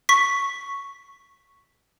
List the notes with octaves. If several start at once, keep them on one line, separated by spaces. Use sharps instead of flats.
C#6 B6